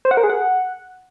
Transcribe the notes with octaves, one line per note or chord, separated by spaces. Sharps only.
C5
F#5
A#4
G#4
F#5